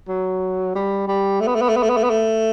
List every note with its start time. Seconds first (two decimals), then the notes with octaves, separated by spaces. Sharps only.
0.08 F#3
0.75 G3
1.08 G3
1.41 A3
1.47 B3
1.55 A3
1.61 B3
1.69 A3
1.76 B3
1.83 A3
1.90 B3
1.97 A3
2.04 B3
2.10 A3